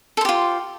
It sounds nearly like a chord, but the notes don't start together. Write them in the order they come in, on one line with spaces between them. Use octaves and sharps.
A4 C5 G4 F4